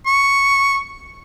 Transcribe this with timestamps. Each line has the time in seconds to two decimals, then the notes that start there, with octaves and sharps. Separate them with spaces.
0.06 C#6